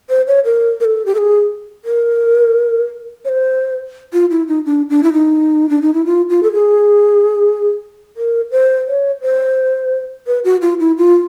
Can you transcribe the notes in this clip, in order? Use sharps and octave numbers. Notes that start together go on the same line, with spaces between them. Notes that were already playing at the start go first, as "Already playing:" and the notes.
C5
C#5
A#4
A#4
A4
G4
A4
G#4
A#4
C#5
C5
F4
E4
D#4
D4
D4
E4
D#4
D4
D#4
E4
F4
F4
A4
G#4
A#4
C5
C#5
C5
B4
F#4
F4
E4
F4